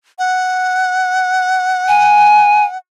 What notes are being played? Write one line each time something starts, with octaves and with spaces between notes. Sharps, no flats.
F#5
G#5